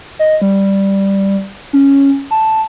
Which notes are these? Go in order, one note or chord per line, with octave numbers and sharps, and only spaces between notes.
D#5
G3
C#4
A5